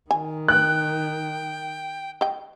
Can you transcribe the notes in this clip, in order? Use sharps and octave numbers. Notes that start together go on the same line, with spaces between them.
D#3 G#5
G5 F#6
D#5 G5